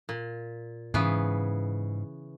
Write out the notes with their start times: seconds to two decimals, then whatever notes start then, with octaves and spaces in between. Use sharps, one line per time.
0.09 A#2
0.94 G#2 C#3 E3 B3